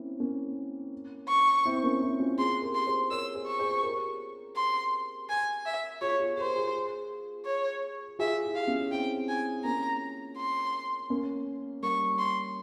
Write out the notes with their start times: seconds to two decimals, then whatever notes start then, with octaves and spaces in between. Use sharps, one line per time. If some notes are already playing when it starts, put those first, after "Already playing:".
Already playing: A#3 C4 C#4 E4
0.20 A#3 C#4
1.28 C#6
1.65 C4 E4
1.83 A#3 C#4
2.02 C4 E4
2.20 C#4 F4
2.38 F4 G#4 C6
2.62 G4 A#4
2.75 C6
2.86 G#4 C5
3.10 A#4 C#5 E6
3.35 G#4 C5
3.47 C#6
3.59 G#4 C5
3.83 G4 A#4
4.56 C6
5.29 G#5
5.66 E5
6.01 F4 G#4 C#5
6.19 F4 G#4
6.37 G4 A#4 C5
6.56 F4 G#4
7.46 C#5
8.19 F4 G#4 E5
8.43 E4 G4
8.56 F5
8.67 C#4 F4
8.92 C4 E4 G5
9.29 G#5
9.64 A#3 C#4 A#5
10.37 C6
11.10 A#3 C#4
11.82 G3 A#3 C#6
12.19 C6